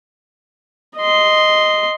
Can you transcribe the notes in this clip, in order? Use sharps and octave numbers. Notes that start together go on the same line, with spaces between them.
D#5 C6